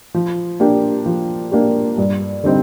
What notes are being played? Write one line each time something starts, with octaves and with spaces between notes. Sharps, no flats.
F3
A#3 D4 G4
F3
A#3 D4 G4
G2
D3 G3 C4 D#4